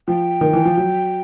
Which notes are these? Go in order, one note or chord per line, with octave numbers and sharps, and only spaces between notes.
F3 G5
D#3
E3
F3
F#3